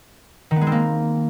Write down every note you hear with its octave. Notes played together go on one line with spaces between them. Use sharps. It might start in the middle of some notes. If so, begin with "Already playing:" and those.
D#3
B3
G#3
C4
A#3